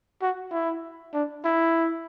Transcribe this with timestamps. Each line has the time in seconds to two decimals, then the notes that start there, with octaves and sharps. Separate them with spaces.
0.22 F#4
0.52 E4
1.14 D4
1.45 E4